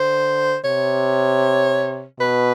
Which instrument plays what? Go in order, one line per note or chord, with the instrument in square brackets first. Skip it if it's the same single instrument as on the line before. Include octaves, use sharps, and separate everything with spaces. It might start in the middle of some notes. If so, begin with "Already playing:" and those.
Already playing: [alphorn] D3 [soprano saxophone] C5
[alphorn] C3 [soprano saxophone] C#5
[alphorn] B2 [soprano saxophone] B4